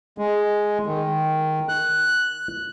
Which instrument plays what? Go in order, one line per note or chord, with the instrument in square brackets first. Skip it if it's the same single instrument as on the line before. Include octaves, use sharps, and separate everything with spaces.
[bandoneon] G#3
D#3
F#6